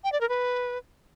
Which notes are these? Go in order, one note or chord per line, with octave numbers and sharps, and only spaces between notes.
G5
D5
A#4
B4